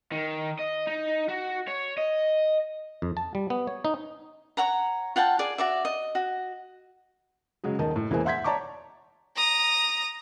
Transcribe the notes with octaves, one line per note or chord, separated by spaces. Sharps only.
D#3
D#5
D#4
F#4
C#5
D#5
F2
A5
G3
B3
C#5
D#4
C#5 F#5 A#5
F4 F#5 G5 A5
G#4 D5
F#4 D5 E5
D#5
F#4
C#3 F#3 G#3 G#4
D#1 D#3 D#5 A5
A2
E1 E3 A#3 G#4 C5 G#5
E5 F#5 C6 G6 G#6 B6
C#5 D5 A5 A#5 C#6 D6
A#5 D#6